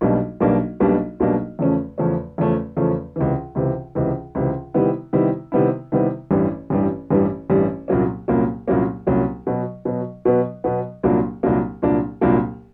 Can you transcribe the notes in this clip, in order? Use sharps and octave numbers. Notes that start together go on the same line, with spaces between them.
B1 B2 G3 A#3 D4
B1 B2 G3 A#3 D4
B1 B2 G3 A#3 D4
B1 B2 G3 A#3 D4
E2 C#3 F3 A3 C#4
E2 C#3 F3 A3 C#4
E2 C#3 F3 A3 C#4
E2 C#3 F3 A3 C#4
C#2 C3 E3
C#2 C3 E3
C#2 C3 E3
C#2 C3 E3
C3 D#3 G3 B3 E4
C3 D#3 G3 B3 E4
C3 D#3 G3 B3 E4
C3 D#3 G3 B3 E4
A1 G2 E3 G3
A1 G2 E3 G3
A1 G2 E3 G3
A1 G2 E3 G3
C2 A#2 F#3 A#3 C#4
C2 A#2 F#3 A#3 C#4
C2 A#2 F#3 A#3 C#4
C2 A#2 F#3 A#3 C#4
B2 F#3 B3
B2 F#3 B3
B2 F#3 B3
B2 F#3 B3
C2 A#2 F#3 A#3 D4
C2 A#2 F#3 A#3 D4
C2 A#2 F#3 A#3 D4
C2 A#2 F#3 A#3 D4